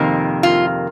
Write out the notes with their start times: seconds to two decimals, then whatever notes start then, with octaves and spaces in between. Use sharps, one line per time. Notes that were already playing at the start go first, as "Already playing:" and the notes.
Already playing: F2 C3 D#3 A#3
0.43 F4